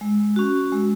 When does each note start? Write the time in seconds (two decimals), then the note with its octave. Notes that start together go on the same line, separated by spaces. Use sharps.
0.01 G#3
0.36 C#4 F#4
0.72 G#3